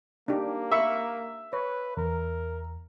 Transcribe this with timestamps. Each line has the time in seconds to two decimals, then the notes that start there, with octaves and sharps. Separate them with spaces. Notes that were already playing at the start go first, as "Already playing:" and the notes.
0.28 A#3 D4 D#4 G4
0.72 A#4 E5 B5 C#6
1.53 B4 C#5
1.97 E2 A#4